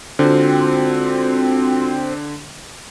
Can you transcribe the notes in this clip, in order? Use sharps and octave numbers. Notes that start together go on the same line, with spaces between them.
D3 G#3 C4 F4 F#4